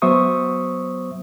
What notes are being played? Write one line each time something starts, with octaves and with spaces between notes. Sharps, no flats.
F#3 B3 C5 E5 C#6 D#6